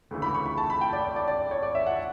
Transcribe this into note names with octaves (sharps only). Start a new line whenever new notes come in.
D2 C#3 E3 A3
B5
C#6
B5
A5
B5
G5
D5
D5
D5
D5
C#5
D5
E5
F#5